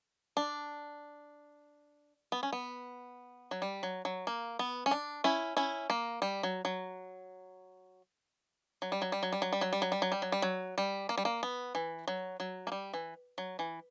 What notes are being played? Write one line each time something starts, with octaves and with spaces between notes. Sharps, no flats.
D4
B3
C#4
B3
F#3
G3
F#3
F#3
A#3
B3
C#4
D4
C#4 E4
C#4 E4
A#3
G3
F#3
F#3
F#3
G3
F#3
G3
F#3
G3
F#3
G3
F#3
G3
F#3
G3
F#3
G3
F#3
G3
F#3
G3
A#3
G3
A#3
B3
E3
F#3
F#3
A#3
G3
E3
F#3
E3